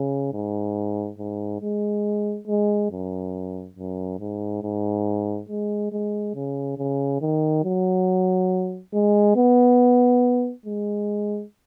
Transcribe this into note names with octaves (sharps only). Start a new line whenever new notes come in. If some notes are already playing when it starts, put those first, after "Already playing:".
Already playing: C#3
G#2
G#2
G#3
G#3
F#2
F#2
G#2
G#2
G#3
G#3
C#3
C#3
D#3
F#3
G#3
B3
G#3